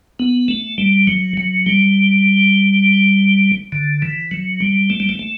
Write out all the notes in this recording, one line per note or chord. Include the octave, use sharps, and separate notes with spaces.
B3
A3
G3
F#3
F#3
G3
D3
E3
F#3
G3
A3
G3
A3
A3